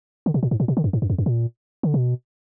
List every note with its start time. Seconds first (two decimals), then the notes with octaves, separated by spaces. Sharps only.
0.26 D3
0.34 B2
0.43 A#2
0.51 G#2
0.60 A#2
0.68 B2
0.77 D3
0.84 F#2
0.93 G#2
1.02 F#2
1.10 F2
1.18 F#2
1.26 A#2
1.83 D3
1.94 B2